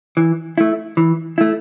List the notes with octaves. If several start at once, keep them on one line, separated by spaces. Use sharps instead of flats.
E3
A3 E4
E3
A3 E4